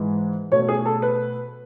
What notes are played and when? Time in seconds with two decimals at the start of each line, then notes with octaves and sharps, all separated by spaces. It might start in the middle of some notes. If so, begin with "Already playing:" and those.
Already playing: G#2 E3 G#3
0.52 B2 A3 C#5
0.69 G#4
0.86 A4
1.02 B4